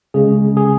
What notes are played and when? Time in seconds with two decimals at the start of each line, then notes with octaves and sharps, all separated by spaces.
0.14 C#3 G#3 C#4 G#4
0.57 G#4